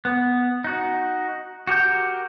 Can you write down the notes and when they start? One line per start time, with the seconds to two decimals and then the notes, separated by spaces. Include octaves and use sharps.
0.05 B3
0.64 D#4 F#4
1.67 F#4 G4 A#4 G6